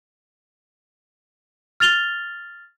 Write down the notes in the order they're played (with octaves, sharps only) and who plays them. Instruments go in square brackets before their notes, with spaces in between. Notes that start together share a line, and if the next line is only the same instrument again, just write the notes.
[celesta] F6 A6 F7 G7